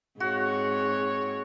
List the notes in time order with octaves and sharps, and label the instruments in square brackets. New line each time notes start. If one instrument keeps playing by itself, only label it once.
[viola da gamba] G#2 C4 C#5 [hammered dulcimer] F#4